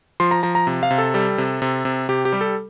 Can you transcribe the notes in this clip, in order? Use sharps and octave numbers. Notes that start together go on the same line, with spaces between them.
F3 C6
A#5
F3 A#5
A#5
C3
F5
C3
A4
G3 A4
C3
C3
C3
C3 G4
G4
G3
A4